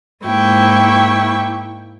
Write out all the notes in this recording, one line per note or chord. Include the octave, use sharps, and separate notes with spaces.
G#2 A#3 E4 G5 C#6